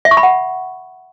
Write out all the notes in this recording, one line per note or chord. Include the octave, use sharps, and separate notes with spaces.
E5
C#6
B5
F#5